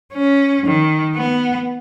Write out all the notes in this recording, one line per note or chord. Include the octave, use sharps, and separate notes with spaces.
C#4
D#3
B3